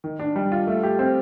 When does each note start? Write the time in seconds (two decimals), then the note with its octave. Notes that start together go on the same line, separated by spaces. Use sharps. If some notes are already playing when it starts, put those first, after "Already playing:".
0.04 D#3
0.20 D4
0.36 G3
0.52 F4
0.67 A3
0.83 G4
0.99 C4